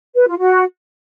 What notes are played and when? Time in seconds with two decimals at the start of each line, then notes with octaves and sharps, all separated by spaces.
0.16 B4
0.27 F4
0.39 F#4